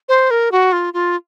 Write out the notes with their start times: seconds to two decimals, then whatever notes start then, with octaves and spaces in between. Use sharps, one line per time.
0.09 C5
0.31 A#4
0.52 F#4
0.72 F4
0.94 F4